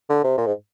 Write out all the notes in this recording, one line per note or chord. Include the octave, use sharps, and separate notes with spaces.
D3
C3
A#2
G#2